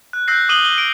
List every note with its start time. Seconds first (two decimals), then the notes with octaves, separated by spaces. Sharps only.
0.13 F#6
0.28 E6 F#6 G6 A#6 C7
0.49 D6 D#6 D#7 F#7 G7
0.65 G7
0.78 D7